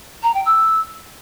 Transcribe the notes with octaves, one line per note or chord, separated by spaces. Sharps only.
A#5
G5
E6